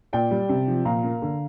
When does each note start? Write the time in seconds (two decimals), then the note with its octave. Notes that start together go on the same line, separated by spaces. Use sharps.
0.13 A#2 D5 G5
0.31 G3
0.49 C3
0.68 F3
0.85 A#2 F5 A#5
1.04 A#3
1.22 D3